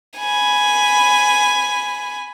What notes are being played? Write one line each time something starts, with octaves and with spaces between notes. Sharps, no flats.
G#5 B5